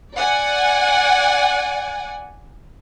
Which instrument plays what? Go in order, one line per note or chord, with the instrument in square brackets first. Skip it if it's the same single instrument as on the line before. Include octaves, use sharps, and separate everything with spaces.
[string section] D5 F#5 G#5